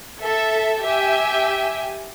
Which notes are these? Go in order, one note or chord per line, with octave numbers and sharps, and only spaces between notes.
A4 E5
G4 E5 G5 G#5